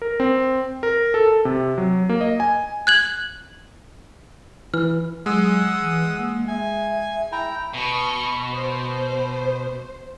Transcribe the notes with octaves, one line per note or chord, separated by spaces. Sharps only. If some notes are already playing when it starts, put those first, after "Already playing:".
A#4
C4
A#4
A4
C3
F#3
A#3
D#5
G#5
F#6 G#6 F#7
E3 F6
F#3 G#3 F#5 D#6 E6
E3
A#3
E5 G#5
E4 G5 A#5
B2 B5 C#6
C5